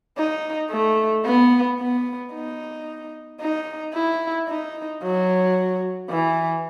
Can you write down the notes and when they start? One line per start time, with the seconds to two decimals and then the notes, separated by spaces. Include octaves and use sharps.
0.18 D#4
0.71 A3
1.26 B3
1.80 B3
2.33 D#4
3.41 D#4
3.94 E4
4.49 D#4
5.03 F#3
6.10 E3